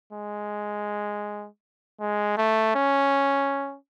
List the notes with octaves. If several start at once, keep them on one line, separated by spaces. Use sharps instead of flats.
G#3
G#3
A3
C#4